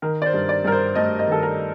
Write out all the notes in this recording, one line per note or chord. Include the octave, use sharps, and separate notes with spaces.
D#3 A#4
D5
C5
G2
D5
G2 A#4
C5
A3 D#5
D#5
D#3 A4
A#4